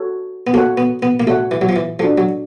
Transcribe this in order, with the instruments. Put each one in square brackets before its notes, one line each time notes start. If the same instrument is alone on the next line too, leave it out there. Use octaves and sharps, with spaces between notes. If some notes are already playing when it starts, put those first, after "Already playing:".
Already playing: [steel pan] F#4 A4 C#5
[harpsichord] B3
[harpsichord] A#3 [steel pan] F#4 A4 C#5 F#5
[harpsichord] B3
B3
A#3
[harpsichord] A3 [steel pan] F#4 A4 C#5 F#5
[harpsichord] E3
F#3
F3
E3
[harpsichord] F3 [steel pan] D4 F#4 A4
[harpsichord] F#3